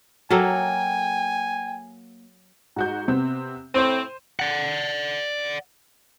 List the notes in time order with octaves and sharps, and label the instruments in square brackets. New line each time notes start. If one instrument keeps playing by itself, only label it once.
[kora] F#3 A#3 A4 [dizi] G5 [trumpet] G#5
[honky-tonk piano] G#2 F#4 G6
C3 B3 C4
[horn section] A2 C4 [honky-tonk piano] C5 D#7
[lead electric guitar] D5 F#5